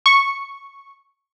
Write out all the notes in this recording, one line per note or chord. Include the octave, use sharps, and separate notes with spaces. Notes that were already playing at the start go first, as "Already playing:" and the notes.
C#6